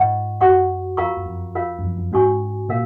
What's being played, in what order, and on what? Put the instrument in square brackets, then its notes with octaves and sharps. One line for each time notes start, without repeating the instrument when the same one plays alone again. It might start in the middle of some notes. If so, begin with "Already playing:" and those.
Already playing: [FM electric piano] G#2 [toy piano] F4 D#5 F#5 C#6
[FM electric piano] F#2 [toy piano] F#4 C#5 F#5 C#6
[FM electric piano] F2 [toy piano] F4 A#4 F5 A#5 C#6
[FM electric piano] F#2
F2
[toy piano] F4 A#4 C#5 F5
[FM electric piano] F#2
F2
F#2
[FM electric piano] G#2 [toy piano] C#4 F#4 C#5 G#5 C#6
[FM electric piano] A#2 [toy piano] A#4 C#5 F5